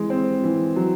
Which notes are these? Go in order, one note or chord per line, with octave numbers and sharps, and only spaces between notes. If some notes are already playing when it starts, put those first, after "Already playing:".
Already playing: E3 G#3
C4
E3
F#3